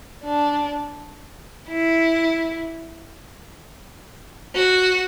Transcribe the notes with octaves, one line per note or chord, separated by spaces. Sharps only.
D4
E4
F#4